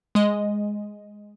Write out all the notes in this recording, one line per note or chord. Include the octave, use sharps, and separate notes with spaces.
G#3 D#5